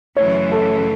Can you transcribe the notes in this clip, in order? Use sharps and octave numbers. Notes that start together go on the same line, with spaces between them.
F#2 C#3 E3 A3 C#5
A4